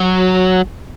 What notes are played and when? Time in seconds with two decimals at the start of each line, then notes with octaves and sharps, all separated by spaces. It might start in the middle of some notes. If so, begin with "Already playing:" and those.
Already playing: F#3